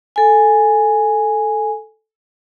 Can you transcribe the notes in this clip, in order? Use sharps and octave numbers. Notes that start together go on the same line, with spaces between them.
A4 G#5